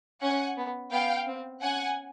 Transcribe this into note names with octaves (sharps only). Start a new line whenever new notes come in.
C#4 F#5 G#5
B3
B3 F5 G5
C4
C#4 F#5 G#5